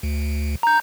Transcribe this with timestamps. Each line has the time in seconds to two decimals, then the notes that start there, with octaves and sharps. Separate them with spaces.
0.03 D2
0.63 A#5 G6